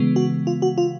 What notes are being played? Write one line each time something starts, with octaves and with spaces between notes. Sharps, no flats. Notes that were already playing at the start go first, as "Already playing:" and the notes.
Already playing: C#3 E3 G#3 B3
F#4
F4
F#4
F4